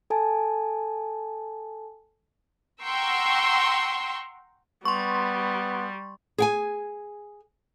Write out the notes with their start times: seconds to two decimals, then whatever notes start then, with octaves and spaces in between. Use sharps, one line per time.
0.10 A4 G#5 A5
2.82 F#5 G5 A#5 C6 C#6 E6
4.85 G3 B3 C6 C#6
6.38 G#4 G5 G#5